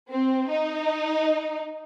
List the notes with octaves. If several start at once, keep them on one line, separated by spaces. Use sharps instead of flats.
C4
D#4